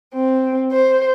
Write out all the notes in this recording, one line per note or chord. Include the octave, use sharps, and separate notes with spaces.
C4
C5